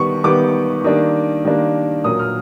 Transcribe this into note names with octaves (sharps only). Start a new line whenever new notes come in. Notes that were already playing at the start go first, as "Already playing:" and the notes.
Already playing: D#3 G3 B3 C#6
D#3 G3 B3 D6
D#3 G3 A#3 D4
D#3 G3 A#3 D4
A#2 F#3 A#3 D#6
F6